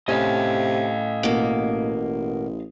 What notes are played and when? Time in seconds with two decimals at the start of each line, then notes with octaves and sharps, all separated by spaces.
0.08 A2 C3 C#4 D#5 F5
1.23 A1 B2 A#3